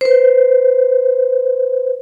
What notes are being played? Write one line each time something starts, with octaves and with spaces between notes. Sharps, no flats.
B4 C5